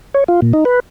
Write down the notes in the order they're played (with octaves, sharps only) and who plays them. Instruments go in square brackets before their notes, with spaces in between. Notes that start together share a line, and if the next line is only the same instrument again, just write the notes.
[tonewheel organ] C#5
F4
A#2
D#4
B4